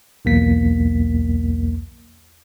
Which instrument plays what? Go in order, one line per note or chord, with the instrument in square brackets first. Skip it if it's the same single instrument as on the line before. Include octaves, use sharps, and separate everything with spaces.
[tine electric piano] B1 E2 A#3 B6